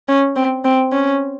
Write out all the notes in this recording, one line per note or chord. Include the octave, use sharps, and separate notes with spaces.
C#4
C4
C4
C#4